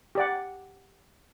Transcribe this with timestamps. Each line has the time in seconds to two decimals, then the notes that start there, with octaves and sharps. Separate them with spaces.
0.15 G4 D5 F#5